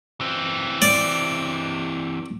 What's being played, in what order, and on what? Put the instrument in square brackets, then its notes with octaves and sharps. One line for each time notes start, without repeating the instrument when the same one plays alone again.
[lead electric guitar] E3 C4
[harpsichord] D5